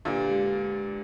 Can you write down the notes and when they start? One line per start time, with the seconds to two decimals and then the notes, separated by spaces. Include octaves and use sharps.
0.05 A#2 D3 A#3 G4 B4
0.26 G#3 G4